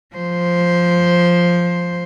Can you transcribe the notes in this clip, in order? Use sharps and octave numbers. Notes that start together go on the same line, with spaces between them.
F3 C5